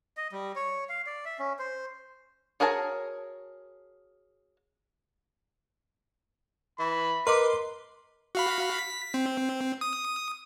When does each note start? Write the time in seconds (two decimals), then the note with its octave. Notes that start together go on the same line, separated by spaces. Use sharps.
0.17 D#5
0.32 G3
0.56 C#5
0.89 F5
1.06 D5
1.25 E5
1.39 C#4
1.59 C5
2.60 F#4 G#4 A#4 C#5 A5
6.79 E3 B5
7.27 A#4 B4 D#5 C6 D6
8.35 F#4 F5 B5
8.78 B6
9.14 C4
9.81 D#6